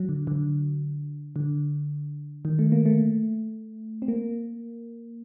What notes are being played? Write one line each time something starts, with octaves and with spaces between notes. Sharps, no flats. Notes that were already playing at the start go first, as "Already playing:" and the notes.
Already playing: F#3
D3
D3
D3
D#3
A3
A#3
A3
C4
A#3